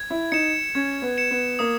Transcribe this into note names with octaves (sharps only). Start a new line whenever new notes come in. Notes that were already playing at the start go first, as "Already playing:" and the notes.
Already playing: G#6
E4
D#4 C#7 E7
C#4 G#6
B3
C#7 E7
B3
A#3 D#6